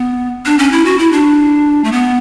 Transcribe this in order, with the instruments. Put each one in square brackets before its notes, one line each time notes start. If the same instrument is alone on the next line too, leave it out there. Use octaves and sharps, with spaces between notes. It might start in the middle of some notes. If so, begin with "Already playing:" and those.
Already playing: [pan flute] B3
D4
C#4
E4
F#4
E4
D4
A3
B3